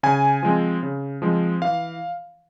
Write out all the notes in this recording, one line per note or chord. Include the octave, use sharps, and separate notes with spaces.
C#3 G#5
F3 G#3 C4
C#3
F3 G#3 C4
E3 F5